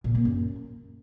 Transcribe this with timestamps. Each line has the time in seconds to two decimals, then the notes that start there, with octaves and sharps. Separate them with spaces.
0.04 A#2
0.15 A#3
0.25 F#2